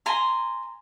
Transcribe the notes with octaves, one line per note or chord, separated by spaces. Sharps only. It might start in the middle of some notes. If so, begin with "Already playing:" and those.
G#5 A#5 C6